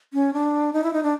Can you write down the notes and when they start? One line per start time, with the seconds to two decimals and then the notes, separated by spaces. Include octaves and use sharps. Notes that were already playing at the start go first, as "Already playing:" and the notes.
0.13 C#4
0.33 D4
0.73 D#4
0.84 E4
0.93 D#4
1.03 D4